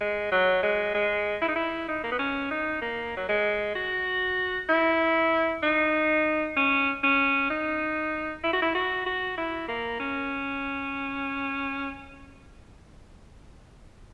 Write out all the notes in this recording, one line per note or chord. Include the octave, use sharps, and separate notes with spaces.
G#3
F#3
G#3
G#3
E4
D#4
E4
D#4
A#3
B3
C#4
D#4
A#3
F#3
G#3
F#4
E4
D#4
C#4
C#4
D#4
E4
F#4
E4
F#4
F#4
E4
A#3
C#4